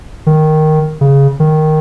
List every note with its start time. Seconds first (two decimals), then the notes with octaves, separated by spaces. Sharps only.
0.27 D#3
1.01 C#3
1.40 D#3